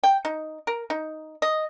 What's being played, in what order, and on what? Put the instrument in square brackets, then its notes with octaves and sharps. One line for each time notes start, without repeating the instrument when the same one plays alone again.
[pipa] G5
D#4
A#4
D#4
D#5